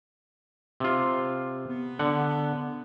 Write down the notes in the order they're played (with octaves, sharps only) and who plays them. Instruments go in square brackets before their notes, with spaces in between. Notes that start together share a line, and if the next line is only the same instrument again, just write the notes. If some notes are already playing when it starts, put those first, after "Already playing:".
[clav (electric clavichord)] C3 F4
[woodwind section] B3
[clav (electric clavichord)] D3 F#5